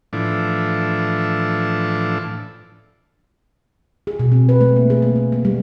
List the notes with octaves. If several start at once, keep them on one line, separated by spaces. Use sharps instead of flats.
A2 E3 F3 D4
G#4
B2
C4
B4
A3
A#3
G#4
A#3
A#3
A#3
G3